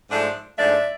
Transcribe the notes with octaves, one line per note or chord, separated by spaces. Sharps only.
G#2 F3 A3 D4
G#2 F3 A3 D4 D5 E5